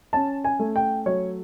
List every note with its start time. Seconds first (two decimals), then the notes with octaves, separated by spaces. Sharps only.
0.13 C#4 A5
0.44 G#5
0.59 A3
0.76 G5
1.06 F#3 C#5